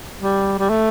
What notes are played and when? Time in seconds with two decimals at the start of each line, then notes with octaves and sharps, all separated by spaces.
0.22 G3
0.59 G3
0.70 A3